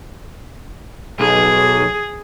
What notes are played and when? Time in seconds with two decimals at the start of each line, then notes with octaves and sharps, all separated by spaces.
1.20 B1 G#4